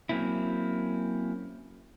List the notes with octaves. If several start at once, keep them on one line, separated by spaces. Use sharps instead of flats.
F#3 A#3 C4 C#4 E4